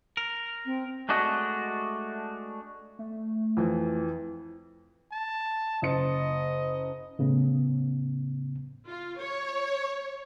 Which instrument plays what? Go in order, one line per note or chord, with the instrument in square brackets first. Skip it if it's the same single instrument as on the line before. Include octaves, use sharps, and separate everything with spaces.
[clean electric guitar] A#4
[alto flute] C4
[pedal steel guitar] G#3 A3 D4 F#4 D#5
[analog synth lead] A3
[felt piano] F2 E3
[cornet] A5
[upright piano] F#1 C6 C#7 [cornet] D#5
[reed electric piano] A2 C#3 B3
[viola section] F4
C#5